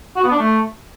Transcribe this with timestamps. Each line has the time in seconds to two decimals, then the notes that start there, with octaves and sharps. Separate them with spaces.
0.16 F#4
0.24 B3
0.31 D4
0.39 A3